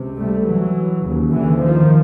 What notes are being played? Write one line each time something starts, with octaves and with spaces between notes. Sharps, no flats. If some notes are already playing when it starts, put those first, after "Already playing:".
Already playing: C#2 C3
G3 A3
E3 F#3
D#2 C#3
D3 E3
D#3 F3